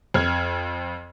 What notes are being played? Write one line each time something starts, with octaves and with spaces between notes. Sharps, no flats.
F2 F6 G#6